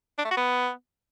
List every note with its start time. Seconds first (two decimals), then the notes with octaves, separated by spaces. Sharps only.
0.18 D4
0.25 A3
0.31 F#4
0.37 B3